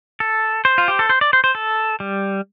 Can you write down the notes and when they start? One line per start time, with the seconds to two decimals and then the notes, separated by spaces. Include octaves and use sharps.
0.20 A4
0.65 C5
0.78 F4
0.88 G4
0.99 A4
1.10 C5
1.21 D5
1.33 C5
1.44 C5
1.55 A4
2.00 G3